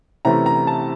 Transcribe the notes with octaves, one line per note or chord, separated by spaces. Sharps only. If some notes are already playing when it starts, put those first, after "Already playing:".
C3 E3 A3 C#4 E4 A#5
A#5
A5